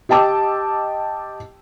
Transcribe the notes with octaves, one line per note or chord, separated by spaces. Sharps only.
G4 D#5 G5 A5 D6 E6